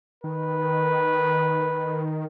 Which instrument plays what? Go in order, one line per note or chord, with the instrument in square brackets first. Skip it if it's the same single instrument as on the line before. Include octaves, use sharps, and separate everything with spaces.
[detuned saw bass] D#3 [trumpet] B4